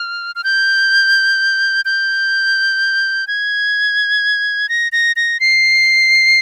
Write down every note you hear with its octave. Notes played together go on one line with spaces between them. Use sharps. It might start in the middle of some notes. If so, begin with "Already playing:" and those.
Already playing: F6
F6
G6
G6
G#6
A#6
A#6
A#6
C7